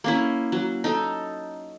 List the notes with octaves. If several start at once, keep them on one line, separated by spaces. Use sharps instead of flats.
A#3 C#4 E4
F#3
D#4 A4